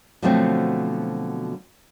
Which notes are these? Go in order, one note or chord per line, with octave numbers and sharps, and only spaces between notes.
B2 D3 F3 F#3 A3 C4